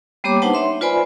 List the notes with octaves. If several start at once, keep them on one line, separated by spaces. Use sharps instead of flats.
G3 A#3 B3 G4 C#5 D6
D4 D#4 B4 C5 F#5 A5
C#5 E5 C6
F4 B4 C5 D5 G#5 B5